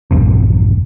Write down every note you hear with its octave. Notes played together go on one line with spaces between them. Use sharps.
A#1 E2 G2 C3